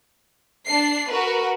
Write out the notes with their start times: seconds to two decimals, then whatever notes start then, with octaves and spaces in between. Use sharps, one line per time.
0.66 D4 C7
1.10 F#4 A#4 B4